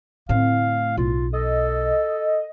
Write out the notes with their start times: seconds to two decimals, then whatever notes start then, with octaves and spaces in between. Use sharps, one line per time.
0.29 A2 D3 C4 F5
0.97 B1 F4
1.33 A4 D#5